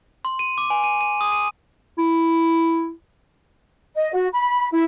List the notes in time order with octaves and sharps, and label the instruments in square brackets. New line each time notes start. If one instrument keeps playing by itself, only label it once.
[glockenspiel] C6
D#7
D6
G#5
D#7
D#7
D#6
D#7
[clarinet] E4
[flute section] D#5
F#4
B5
E4